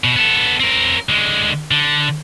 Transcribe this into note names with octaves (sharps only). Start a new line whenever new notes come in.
B2
B3 A4
C4 A#4
D3 G#3
D3